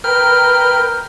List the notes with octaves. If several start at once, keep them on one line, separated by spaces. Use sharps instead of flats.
A#4 B4 G5 F6